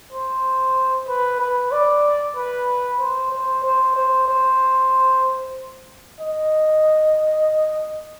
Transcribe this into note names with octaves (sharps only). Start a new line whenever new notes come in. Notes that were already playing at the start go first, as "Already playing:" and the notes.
C5
B4
B4
D5
B4
C5
C5
C5
C5
C5
D#5